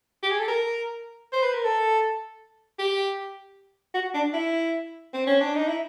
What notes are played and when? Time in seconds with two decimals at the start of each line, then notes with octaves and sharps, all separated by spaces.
0.23 G4
0.31 G#4
0.39 A4
0.48 A#4
1.33 C5
1.43 B4
1.54 A#4
1.64 A4
2.79 G4
3.94 F#4
4.14 D4
4.33 E4
5.14 C4
5.27 C#4
5.40 D4
5.55 D#4
5.68 E4